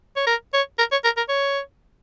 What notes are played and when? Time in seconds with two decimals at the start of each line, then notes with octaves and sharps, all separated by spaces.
0.16 C#5
0.27 A#4
0.53 C#5
0.79 A#4
0.92 C#5
1.04 A#4
1.17 A#4
1.29 C#5